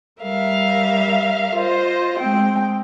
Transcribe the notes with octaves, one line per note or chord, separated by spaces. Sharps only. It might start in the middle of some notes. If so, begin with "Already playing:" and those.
G3 A#4 E5 F5
F4 C5 D#5
G#3 C4 G5